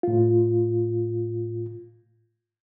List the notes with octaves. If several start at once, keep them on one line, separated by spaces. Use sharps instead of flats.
A2 F4